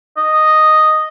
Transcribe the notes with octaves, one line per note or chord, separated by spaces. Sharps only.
D#5